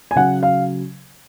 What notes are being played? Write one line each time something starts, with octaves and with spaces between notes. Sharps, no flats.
G#5
C#3 F#3 F#5
F5